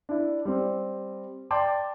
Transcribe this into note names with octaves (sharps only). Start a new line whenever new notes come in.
D4 E4
G3 C4
D5 G5 A5 C6 D6